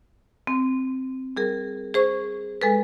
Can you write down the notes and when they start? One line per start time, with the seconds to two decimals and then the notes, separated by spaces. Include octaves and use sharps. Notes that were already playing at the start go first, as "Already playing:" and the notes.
0.47 C4
1.37 G3 G#4 A#4
1.94 G#4 C5 C#6
2.62 G#3 A4 B4